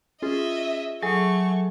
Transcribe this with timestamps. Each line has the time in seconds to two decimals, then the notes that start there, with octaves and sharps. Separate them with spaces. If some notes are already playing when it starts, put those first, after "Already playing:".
0.22 C#4 F4 G#4 D#5 E5
1.03 F#3 A3 G#4 A4 G#5 C#6